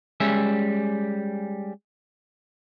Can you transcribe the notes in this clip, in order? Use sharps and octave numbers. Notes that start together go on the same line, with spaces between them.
G3 G#3 C#4 E5